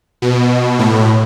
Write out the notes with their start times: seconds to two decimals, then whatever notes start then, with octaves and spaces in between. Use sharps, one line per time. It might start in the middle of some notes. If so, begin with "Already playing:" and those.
0.22 B2
0.79 A2